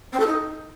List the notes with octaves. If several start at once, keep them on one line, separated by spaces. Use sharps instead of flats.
C4
A4
D#4